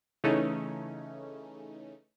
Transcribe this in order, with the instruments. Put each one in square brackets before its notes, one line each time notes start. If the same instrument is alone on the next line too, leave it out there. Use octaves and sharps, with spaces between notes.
[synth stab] C#3 E3 A3 C#4 D#4